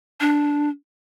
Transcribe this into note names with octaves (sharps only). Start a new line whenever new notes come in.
D4